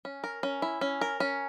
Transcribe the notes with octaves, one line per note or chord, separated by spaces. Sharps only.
C#4
A#4
C#4
E4
C#4
A#4
C#4